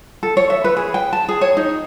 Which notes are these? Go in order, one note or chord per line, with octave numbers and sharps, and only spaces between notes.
A4
C#5
E5
B4
G#4
G5
A5
G#4
C#5
D#4